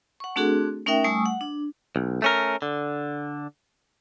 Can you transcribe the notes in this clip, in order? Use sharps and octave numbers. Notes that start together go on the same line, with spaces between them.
F#5 C#6
A3 C4 D4 F#4 G#4 A4
A3 C#4 D#4 A#4 E5 G5
G3 A3 G#5 C#6 D#6 E6
F#5
D4
B1
A3 C#4 A#4
D3